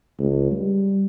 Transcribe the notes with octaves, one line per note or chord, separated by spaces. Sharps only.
C#2
G3